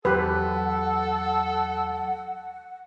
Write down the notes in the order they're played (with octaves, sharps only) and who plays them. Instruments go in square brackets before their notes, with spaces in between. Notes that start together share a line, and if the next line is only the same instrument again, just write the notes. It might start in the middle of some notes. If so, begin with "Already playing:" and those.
[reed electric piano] E2 F#3 [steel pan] G4 B4 [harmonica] A4 [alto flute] F#5